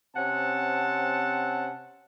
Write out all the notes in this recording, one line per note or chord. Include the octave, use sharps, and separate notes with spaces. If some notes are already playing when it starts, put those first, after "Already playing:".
C3 C4 C#4 F#5 A5